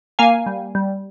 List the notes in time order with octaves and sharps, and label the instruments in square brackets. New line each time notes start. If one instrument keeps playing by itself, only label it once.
[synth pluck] A#3 F5 G#5
G3
G3